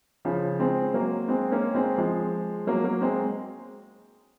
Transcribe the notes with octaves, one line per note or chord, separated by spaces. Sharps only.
C#3 F3
G#3 C4
F#3 A#3
G#3 C4
A#3 C#4
G#3 C4
F3 G#3
F#3 A#3
F#3 A#3
G#3 C4